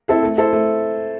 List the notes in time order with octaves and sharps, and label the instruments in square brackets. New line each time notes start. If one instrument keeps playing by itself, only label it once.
[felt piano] C4 E4 A4 C5
A3
E4 A4 C5
A3